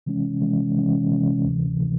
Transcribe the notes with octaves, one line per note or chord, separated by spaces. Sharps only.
C3 E3 G#3 C#4
C3 E3 G#3 C#4
C3 E3 G#3 C#4
C3 E3 G#3 C#4
D2 C3 E3
C3 E3